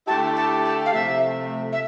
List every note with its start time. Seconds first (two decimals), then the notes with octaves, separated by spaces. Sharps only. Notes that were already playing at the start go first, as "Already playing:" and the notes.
0.07 D3 A3 E4 G4 A5
0.36 A5
0.65 A5
0.86 F5
0.93 C3 F3 A3 E5
1.72 E5